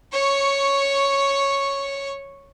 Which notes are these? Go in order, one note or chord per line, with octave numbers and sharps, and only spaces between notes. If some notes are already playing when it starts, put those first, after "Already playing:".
C#5 C#6